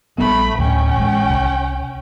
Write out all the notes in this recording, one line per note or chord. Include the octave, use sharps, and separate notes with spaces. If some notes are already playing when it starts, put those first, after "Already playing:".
A#1 G3 A3 B3 B5
D2 A2 C#4 G5
A1 G#3
C2